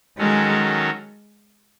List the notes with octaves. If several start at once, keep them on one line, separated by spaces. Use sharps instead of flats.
D#3 F#3 G#3 C#4 F#4 A4